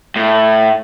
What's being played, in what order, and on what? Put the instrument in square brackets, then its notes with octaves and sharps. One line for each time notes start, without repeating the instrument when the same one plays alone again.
[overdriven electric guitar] A2